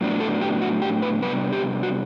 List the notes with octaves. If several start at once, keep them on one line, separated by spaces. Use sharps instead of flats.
A2 F#3 B3 D4
A4
G4
F#4
G4
B4
C3 G3 B3 D4 B4
G4
F#4